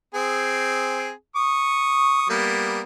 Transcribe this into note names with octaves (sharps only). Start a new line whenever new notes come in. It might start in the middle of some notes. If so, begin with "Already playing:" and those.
C4 G#4
C#6 D#6
G3 A#3 B3